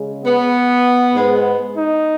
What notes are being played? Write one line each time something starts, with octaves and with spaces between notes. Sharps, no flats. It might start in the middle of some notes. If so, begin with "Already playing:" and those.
Already playing: C#3 G#3
B3
G#2 G#3 B3
D#4